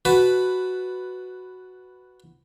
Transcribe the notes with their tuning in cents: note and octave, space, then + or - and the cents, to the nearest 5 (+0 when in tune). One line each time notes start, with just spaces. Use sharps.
F#4 +0 B4 +5 A5 -10